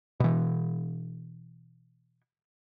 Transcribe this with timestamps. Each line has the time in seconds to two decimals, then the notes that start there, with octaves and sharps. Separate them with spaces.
0.20 B2 E3